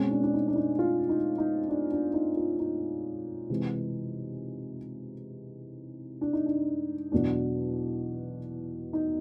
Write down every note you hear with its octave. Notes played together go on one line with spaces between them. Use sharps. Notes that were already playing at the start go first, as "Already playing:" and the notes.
Already playing: B2 G#3 C4 C#4
D4
D4
D#4
D4
D#4
F4
D#4
D#4
D4
D4
D#4
F4
D#4
C3 E3 G#3
D4
D#4
D4
E2 B2 F#3 D4
D#4